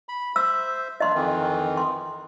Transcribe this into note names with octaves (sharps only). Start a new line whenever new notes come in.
B5
C5 E5 E6
A#3 D4 D#5 C6
F2 D#3 E3
C6